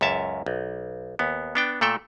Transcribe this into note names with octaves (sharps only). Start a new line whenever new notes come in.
C#2 F#2 C#5 E5 A5
B1
D#2 B3
B3 D4 G5
A#2 A3 A4 G5